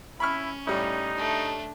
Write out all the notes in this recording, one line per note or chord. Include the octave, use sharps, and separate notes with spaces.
C#4 E4 B5 C#6 F6
A2 G3 D#4
A3 D4